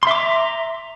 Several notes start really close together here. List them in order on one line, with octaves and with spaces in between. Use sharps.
C6 E5 D6 A#5